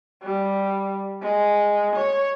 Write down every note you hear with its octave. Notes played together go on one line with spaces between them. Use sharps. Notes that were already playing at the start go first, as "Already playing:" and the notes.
G3
G#3
C#5